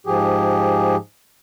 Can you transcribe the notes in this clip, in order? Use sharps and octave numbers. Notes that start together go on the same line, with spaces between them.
G#2 F3 G4 G#4